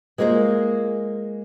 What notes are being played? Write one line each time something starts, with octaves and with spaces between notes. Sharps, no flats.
G#3 A#3 F4 G#4 C5